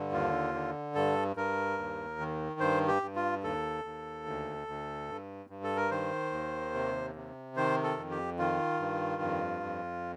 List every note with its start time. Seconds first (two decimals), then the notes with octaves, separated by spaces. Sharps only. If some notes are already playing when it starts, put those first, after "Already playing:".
Already playing: G2 D3
0.12 D#2 F4
0.54 D3
0.95 G2 A4
1.36 G2 A#4
1.78 D#2
2.20 D#3
2.60 G2 C5
2.88 G4
3.02 G2
3.16 F4
3.44 D#2 A4
3.84 D#2
4.26 D2
4.68 D2
5.09 G2
5.50 G2
5.64 A4
5.76 A#4
5.91 D#3 C5
6.32 D#2
6.74 C3
7.15 C3
7.56 D#3 C5
7.84 A4
7.97 F2
8.11 G4
8.38 D#3 F4
8.80 G2
9.22 F2
9.63 F2